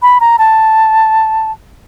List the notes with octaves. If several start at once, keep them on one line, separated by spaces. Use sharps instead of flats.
B5
A#5
A5